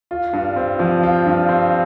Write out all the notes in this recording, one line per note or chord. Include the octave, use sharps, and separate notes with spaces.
F4
G2
C4
F3
F4
G2
C4